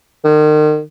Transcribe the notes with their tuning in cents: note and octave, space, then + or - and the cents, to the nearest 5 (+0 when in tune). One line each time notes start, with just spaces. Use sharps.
D#3 -40